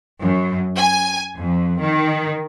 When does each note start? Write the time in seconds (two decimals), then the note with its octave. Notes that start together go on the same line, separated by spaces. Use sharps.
0.21 F#2
0.78 G#5
1.37 F2
1.81 D#3